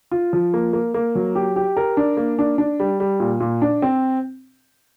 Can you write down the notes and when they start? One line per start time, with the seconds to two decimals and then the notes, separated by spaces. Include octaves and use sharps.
0.11 F4
0.33 F3
0.54 A#3
0.73 A#3
0.94 A#3
1.15 F#3
1.35 G4
1.56 G4
1.77 A#4
1.97 D4
2.17 A#3
2.39 D4
2.58 D4
2.80 G3
3.00 G3
3.20 A#2
3.40 A#2
3.62 D4
3.82 C4